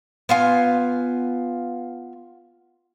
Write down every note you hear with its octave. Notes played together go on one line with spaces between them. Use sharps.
B3 F4 G#5